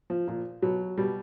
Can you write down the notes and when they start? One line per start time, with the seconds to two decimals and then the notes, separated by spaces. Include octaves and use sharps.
0.10 F3
0.28 A#2 F3
0.62 B2 F#3
0.98 B2 G3